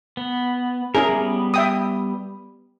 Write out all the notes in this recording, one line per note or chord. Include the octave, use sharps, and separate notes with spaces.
B3
C#4 E4 G#4 A#4
G3 B3
E5 G5 D#6